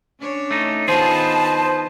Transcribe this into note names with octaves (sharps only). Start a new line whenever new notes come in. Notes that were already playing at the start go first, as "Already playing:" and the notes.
C#4 D4 C#5
A3 D#4
D#3 B3 F4 G#4 B4 C5 D#5 A5